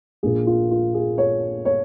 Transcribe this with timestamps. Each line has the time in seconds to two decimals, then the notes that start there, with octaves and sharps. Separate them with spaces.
0.23 A#1 A#2 A#3 G#4
0.47 F4
0.71 F4
0.94 G#4
1.18 C#5
1.65 C#5